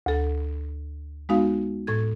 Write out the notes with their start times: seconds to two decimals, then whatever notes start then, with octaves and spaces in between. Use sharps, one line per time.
0.06 D2 A4
1.29 G#3 B3 D#4 F#4 F5
1.87 A2 A4 G#6